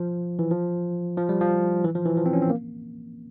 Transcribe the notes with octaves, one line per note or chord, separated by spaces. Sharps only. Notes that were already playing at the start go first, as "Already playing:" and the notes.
Already playing: F3
E3
F3
F3
G3
F3
E3
F3
E3
F3
C4
C#4
C4
A#3